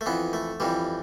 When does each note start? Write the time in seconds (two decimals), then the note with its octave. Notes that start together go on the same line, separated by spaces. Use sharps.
0.01 A3
0.06 F2 E3 B3
0.33 A3
0.60 F2 E3 G3